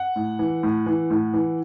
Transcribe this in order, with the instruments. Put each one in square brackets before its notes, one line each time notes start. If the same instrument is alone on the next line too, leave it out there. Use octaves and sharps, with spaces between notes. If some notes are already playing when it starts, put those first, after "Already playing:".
Already playing: [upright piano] F#5
A2
E3
A2
E3
A2
E3